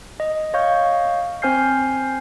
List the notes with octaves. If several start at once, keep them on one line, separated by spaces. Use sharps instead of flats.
D#5
C#5 D#5 F5 C#6 G6
C4 C5 G#5 F6 G6 C7